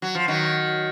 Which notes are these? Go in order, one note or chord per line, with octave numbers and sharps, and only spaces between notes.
F#3
F3
D#3 F#3